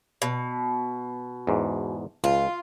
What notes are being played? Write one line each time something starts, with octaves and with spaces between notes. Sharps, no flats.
B2
E2 G#2
C#2 F4